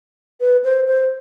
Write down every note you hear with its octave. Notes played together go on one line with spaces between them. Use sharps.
B4
C5
C5